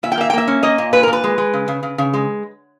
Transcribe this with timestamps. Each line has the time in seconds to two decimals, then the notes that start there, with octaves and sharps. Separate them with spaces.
0.03 A#2 E5
0.12 G5
0.17 A#3 E5
0.30 G5
0.33 A#3 E5
0.48 C#4
0.63 A#3 D#5
0.78 A#2
0.93 A#2 B4
1.03 A#4
1.08 A#2 B4
1.24 G#3
1.38 G#3
1.54 C#3
1.68 C#3
1.83 C#3
1.98 C#3
2.14 G#3